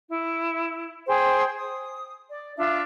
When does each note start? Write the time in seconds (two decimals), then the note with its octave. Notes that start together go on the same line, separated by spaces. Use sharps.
0.09 E4
1.07 G#4 C5 G5
1.56 D#6
2.30 D5
2.58 D4 F4 E5